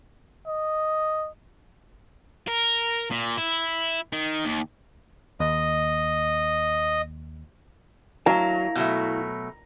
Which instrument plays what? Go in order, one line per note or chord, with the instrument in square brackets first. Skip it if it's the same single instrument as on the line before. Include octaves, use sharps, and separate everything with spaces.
[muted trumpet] D#5
[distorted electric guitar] A#4
A#2
E4
D#3
D#2
[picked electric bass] D#2 [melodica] D#5
[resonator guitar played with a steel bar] F#3 [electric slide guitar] E4 F5 [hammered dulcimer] A#5
[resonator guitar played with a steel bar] B2 F#3 A3